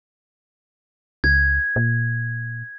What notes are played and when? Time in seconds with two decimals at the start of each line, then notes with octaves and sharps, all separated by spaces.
1.24 C#2 G#6
1.76 A#2